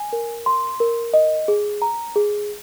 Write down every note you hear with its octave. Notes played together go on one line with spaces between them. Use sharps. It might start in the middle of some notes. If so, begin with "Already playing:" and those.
Already playing: G#5
A#4
C6
A#4
D#5
G#4
A#5
G#4